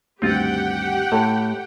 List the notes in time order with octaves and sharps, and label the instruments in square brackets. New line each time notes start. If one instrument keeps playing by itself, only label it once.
[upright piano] D2 G2 D#3 [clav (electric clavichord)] C4 F4 [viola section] G4 F#5 G5
[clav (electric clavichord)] A2 [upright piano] A4